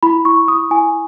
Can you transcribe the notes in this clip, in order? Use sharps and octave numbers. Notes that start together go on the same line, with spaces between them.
E4 B5
E4 C#6
E4 D#6
E4 G#5